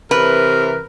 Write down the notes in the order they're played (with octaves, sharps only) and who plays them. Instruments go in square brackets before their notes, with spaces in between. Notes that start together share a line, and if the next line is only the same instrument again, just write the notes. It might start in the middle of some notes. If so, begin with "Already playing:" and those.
[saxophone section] C3 E3 A#4 [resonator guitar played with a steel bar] B4